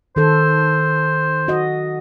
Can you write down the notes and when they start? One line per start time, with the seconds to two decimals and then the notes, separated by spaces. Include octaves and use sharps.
0.16 D#3 A4 C5
1.48 F#4 D#5